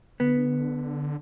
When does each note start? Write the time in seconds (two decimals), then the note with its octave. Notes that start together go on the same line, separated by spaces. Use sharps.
0.20 D3 B3